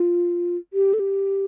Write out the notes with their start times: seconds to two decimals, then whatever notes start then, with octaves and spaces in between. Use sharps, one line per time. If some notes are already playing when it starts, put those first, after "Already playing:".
Already playing: F4
0.73 G4
0.94 A4
0.99 G4